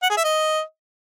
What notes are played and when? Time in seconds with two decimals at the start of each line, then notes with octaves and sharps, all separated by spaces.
0.03 F#5
0.10 G#4
0.17 E5
0.24 D#5